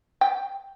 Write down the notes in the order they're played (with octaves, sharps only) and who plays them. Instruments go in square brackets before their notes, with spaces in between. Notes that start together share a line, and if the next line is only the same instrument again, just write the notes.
[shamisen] G5